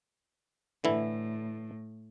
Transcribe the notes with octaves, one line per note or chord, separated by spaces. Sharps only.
A2 D3 E3 E4